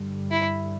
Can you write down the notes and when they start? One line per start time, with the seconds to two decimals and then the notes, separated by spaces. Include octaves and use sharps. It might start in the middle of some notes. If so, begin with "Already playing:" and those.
Already playing: G2 D3 G3
0.31 E4